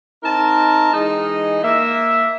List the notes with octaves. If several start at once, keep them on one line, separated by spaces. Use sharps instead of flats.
C4 D#4 A#4 A5 A#5
E3 G#3 D#4 D#5
A#3 E5